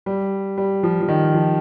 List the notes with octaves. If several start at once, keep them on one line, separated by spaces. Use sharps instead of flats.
G3
G3
F3
F3
D#3
F3